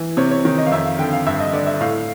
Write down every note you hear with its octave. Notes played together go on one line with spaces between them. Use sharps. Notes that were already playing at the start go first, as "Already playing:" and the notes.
Already playing: E3
C3 C#5
C#5
D#3
D#5
F5
F2 E5
F5
D3 G5
F5
G2 E5
D#5
D3 D5
E5
A2 F5